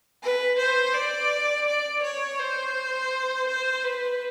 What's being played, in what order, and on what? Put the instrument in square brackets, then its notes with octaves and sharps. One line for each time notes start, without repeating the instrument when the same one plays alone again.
[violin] B4
C5
D5
D5
C#5
C5
C5
B4